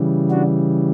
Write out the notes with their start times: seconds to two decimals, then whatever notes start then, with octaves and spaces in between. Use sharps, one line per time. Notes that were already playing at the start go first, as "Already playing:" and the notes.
Already playing: C#3 E3 G3
0.30 D4 F#4